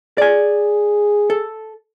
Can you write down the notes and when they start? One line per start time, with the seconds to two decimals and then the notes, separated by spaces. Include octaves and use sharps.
0.18 G#4 D5 G#5
1.30 A4